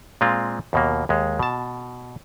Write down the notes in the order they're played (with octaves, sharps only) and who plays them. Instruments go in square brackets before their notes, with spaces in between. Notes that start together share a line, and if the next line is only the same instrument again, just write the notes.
[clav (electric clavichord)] A#2 G#3 C4 F4
D#2 B2 A#3
D#2 G#3
B2 A5